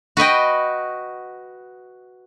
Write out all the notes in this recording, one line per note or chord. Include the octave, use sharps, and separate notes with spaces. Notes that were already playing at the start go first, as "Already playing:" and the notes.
F#4 B4 D#5 G5